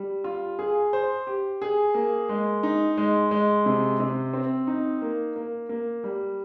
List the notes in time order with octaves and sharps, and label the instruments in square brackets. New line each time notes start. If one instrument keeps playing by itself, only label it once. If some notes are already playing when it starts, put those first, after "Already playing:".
Already playing: [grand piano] G3
F4
G#4
C5
G4
G#4
A#3
G#3
D#4
G#3
G#3
C3
C3
C4
D#4
A#3
A#3
A#3
G3